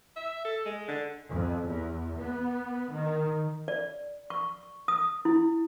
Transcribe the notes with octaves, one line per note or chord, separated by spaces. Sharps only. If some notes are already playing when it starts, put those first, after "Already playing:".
E5
A4
G#3
D3
F2
E2
B3
D#3
D5
C#6
D#6
E4